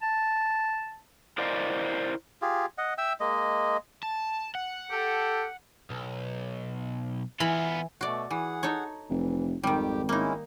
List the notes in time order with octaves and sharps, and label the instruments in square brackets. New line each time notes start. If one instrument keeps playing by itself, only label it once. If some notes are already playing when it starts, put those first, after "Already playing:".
[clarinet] A5
[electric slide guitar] E4 A#4 C5 D5 D#5 F5
[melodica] F4 G4 G#4
D#5 F#5
E5 G5 E6
G#3 A#3 D#5
[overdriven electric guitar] A5
F#5
[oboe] G4 [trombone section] A4
[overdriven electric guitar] B1
[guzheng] E3 B5 [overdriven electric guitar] B3 F4
[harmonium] B2 A3 [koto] F#4 D5
[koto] E3 [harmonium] G#4 F#5
[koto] D#4 A4 C#5
[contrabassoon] F1 [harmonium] E3
[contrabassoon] G#1 [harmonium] F2 G4 G5 [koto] D#3 G3
[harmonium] G#3 C#4 E4 [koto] A#3 D#4